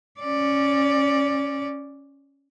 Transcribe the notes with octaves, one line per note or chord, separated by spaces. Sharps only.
C#4 D5